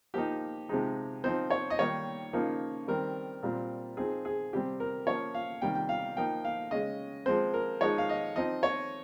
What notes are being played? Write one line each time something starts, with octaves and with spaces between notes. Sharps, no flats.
F3 A#3 D#4 G4
C3 F3 G#3 D#4
F3 C4 D#4 C5
C#5
D#5
D#3 G3 A#3 D#4 C#5
C#3 F3 A#3 D#4
D#3 G3 C4 A#4
A#2 G3 C4
F3 C4 D#4 G#4
G#4
C3 G3 C4 G4
A#4
F3 A#3 C#4 C#5
F5
C3 D#3 G3 A#3 G5
G5
F5
F3 A#3 D#4 G5
F5
C#3 G#3 C#4 D#5
F3 G#3 C4 C5
A#4
F3 G#3 D#4 C#5
F5
D#5
F3 C4 D#4 D#5
C#5